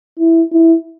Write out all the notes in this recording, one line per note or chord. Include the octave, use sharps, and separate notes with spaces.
E4
E4